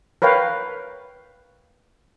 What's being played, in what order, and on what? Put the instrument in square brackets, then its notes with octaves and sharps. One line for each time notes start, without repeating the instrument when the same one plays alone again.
[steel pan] A#4 B4 C#5 F5 G5